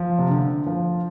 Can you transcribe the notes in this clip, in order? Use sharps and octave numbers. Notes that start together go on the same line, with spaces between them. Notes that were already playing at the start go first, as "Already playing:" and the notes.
Already playing: F3
C3
D3
F3